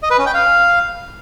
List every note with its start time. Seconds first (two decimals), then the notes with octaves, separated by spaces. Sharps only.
0.03 D#5
0.11 B4
0.18 C#4
0.26 G5
0.34 F5